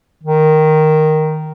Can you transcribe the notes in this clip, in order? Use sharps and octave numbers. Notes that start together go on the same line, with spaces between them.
D#3